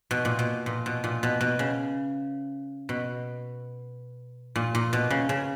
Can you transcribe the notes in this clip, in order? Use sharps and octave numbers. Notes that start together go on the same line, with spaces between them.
B2
A#2
B2
A#2
B2
A#2
B2
B2
C#3
B2
A#2
A#2
B2
C#3
C#3